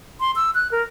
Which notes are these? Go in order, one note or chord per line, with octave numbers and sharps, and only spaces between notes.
C6
E6
F#6
A#4